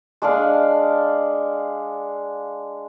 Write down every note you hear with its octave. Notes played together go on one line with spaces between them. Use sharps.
G#3 D4 D5 F5